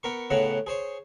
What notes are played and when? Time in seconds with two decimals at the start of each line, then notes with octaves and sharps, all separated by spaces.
0.03 B3 A#4 C#6
0.30 A2 C#3 B3 C#5 F#5 A#5
0.67 G#4 C5 C#5